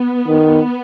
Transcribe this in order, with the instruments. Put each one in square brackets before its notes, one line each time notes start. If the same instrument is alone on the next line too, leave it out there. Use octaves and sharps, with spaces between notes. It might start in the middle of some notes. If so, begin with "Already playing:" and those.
Already playing: [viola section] B3
[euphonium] D#3